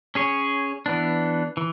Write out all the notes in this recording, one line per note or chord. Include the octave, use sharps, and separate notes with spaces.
C#4 G#4 C#5
E3 B3 D4
E3